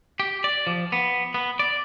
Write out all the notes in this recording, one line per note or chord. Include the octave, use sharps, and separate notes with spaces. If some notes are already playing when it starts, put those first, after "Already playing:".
G4
D5
F3
B3
B3
D5